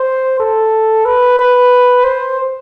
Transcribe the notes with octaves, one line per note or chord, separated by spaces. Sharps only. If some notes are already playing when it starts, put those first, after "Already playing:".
Already playing: C5
A4
B4
B4
C5